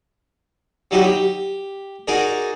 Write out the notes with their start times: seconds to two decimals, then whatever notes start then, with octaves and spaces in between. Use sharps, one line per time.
0.91 F#3 G3 D#4 E4 G4
1.04 G4
2.08 D#4 F#4 G#4 A#4 D5